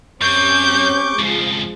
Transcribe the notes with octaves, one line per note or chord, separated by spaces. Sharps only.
F#2 C4 C#4 G4 C#6 D6 G6
F2 C#3 F3 G#3 G#4